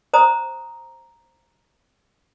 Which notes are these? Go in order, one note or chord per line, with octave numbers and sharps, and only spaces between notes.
C5 A#5 D#6